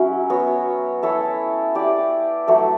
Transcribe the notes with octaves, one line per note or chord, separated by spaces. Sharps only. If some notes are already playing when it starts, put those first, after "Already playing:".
Already playing: F#3 C#4 E4
B3 F#4 C#5
E4 A4 C#5 E5
E4 G4 D5
F#3 A3 E4 A4